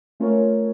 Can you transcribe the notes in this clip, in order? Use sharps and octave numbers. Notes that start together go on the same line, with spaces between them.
A3 C#4 F4 A#4 C#5